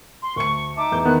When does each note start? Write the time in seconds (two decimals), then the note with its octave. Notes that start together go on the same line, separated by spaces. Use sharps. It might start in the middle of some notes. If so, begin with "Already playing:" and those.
0.23 C6
0.36 D2 C#6 C#7
0.77 D#4 E5 A5 D6
0.92 E2 G6
1.05 D#3 B3 F#6